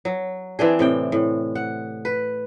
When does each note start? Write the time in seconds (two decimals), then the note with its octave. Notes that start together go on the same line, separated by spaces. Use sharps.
0.05 F#3
0.59 E3 C4 D4 G#4
0.79 A2 C3 G5
1.12 A2
1.55 F#5
2.05 B4